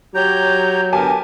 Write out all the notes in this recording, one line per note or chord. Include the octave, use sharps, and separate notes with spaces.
F#3 G4 C#5 A#5 G6
D3 B3 G4 A#4 G#5 A5